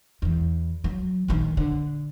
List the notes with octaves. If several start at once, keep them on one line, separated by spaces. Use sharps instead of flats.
E2 E3
F#3
A#1 D#3
D3